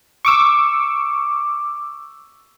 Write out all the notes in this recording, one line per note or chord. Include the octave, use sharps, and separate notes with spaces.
C#6 D6 E6